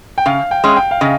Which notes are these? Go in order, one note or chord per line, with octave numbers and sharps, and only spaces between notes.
G5
C#3 F5
G5
G#3 C#4
G5
F5
C#3 D#5